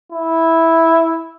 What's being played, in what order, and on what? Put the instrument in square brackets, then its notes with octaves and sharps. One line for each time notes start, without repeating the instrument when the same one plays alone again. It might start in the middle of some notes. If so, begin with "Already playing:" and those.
[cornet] E4